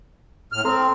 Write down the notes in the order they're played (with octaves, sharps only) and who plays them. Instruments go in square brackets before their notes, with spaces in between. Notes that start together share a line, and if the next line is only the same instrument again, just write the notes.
[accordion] A2 F6
[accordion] C4 [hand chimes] A4 A#5 C6